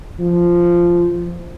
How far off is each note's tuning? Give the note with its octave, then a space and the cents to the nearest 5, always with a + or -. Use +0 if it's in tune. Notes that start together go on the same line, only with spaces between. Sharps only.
F3 -10